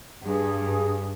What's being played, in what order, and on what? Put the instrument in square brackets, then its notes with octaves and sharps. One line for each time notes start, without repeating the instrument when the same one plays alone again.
[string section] G2 [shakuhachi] G#4